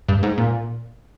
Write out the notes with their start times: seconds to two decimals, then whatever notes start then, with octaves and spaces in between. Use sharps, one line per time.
0.08 G2
0.23 G#2
0.38 A#2